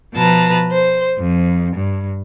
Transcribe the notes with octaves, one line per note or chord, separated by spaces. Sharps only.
B2 F3 B4 A5 A#5
C5
F2
G2